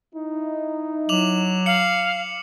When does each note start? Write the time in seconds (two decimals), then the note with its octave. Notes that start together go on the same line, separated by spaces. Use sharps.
0.15 D#4 E4
1.09 F#3 D6 F7 F#7
1.66 F5 C#7 F#7